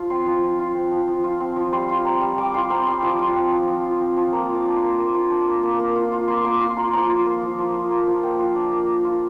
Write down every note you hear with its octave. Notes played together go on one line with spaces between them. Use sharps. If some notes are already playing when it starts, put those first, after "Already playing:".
Already playing: F3 F4
C4 C6
F3
F3
F4
C4
F3
F3
F4
C4
F3
G3 C6
F4
C4 A#5
G3
G3 D6
F4 C6
C4 A#5
G3 C6
F3 D6
F4
C4
F3
F3
F4
C4
F3
A#3 A#5
F4
D6
D4
C6
A#3
A#3
F4
D4
A#3
A#3
A#3
F4
F4
A#3 C6
A#3 D6
F4 C6
F4 A#5
F3 A#5
F4
A#3
F3
F3
F4
A#3
F3
A#3 G5
F4
D4
A#3
A#3
F4